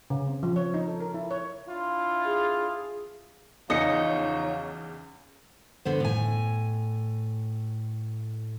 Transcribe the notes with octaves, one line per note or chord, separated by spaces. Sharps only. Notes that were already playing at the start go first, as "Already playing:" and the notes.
C#3
C4
F3
C#5
D#4
A4
A#4
E4
C#5
D4 E4 F4
G#4
E2 C#3 F3 F#3 D#4 D#5 C#7
D3 B3 C5
A2 G#5